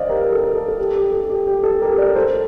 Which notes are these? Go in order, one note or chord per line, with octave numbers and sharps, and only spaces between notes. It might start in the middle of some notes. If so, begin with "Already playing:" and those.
Already playing: C5 D5 D#5 F5
G4 A#4
A#4
A4
A4
A4
G4
G4
A4
G4
G4
A4
G4 A#4
A#4 D5
A4 C5